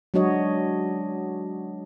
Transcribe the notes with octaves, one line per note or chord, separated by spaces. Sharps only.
F#3 G#3 D4 F#4 C#5 D#5